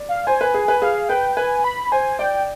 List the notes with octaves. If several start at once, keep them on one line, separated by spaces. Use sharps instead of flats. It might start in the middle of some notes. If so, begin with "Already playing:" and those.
Already playing: D5
F5
C5 G#5
B4
G#4
B4
G#4 F5
B4 G5
B4 G#5
B5
C5 G#5
D5 G5